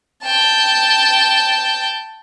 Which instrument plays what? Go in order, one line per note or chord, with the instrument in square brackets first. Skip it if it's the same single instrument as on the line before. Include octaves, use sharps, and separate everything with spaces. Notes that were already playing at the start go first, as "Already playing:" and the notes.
[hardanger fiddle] G5 A5